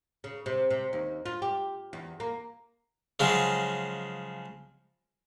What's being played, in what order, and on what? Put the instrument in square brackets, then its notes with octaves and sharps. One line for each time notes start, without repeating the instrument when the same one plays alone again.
[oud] C#3
C3
C3
D#2
F4
G4
E2
A#3
[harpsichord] C#3 F3 F#3 G#3